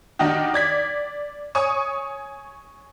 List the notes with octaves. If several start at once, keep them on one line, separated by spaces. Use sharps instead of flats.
D#3 D4 D#4 F#4 G4
D5 G#6 B6
C#5 G#5 C#6 D#6